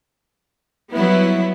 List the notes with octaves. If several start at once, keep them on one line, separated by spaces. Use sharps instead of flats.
F#3 G3 B3 E4